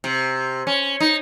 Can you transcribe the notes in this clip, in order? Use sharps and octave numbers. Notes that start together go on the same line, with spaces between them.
C3
C#4
D#4